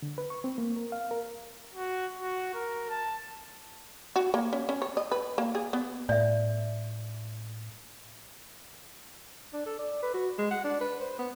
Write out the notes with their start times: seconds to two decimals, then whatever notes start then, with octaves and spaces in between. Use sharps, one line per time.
0.02 D3
0.18 B4
0.30 C#6
0.44 C4
0.58 A#3
0.76 A#4
0.92 F5
1.11 A#4
1.74 F#4
2.20 F#4
2.54 A#4
2.89 A5
4.16 F#4
4.34 A#3
4.53 C#4
4.69 C#4
4.82 C#5
4.97 D#5
5.12 B4
5.38 A#3
5.55 G#4
5.73 B3
6.09 A2 D5 E5
9.53 D4
9.66 A4
9.78 D5
10.02 B4
10.14 F#4
10.38 G#3
10.51 F#5
10.64 D4
10.80 B4
11.00 C5
11.19 B3